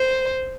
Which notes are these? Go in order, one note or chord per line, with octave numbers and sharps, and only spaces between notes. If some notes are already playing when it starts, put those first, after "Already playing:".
Already playing: C5